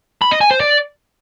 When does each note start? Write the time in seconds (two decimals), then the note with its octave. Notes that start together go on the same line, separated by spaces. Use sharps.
0.22 B5
0.31 D#5
0.41 G#5
0.51 C5
0.60 D5